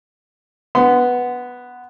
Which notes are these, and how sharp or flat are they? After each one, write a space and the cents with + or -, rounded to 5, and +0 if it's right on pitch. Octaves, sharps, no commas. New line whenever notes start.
B3 +0 C6 -35